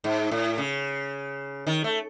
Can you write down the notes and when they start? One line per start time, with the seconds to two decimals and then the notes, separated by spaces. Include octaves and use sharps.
0.04 G#2
0.31 A2
0.58 C#3
1.67 D#3
1.84 A3